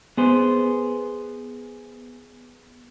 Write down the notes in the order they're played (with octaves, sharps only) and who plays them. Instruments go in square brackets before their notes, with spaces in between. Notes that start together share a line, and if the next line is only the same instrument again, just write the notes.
[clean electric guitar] B3 G#4 C5